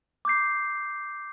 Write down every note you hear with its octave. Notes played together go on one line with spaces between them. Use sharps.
D6 G6 C7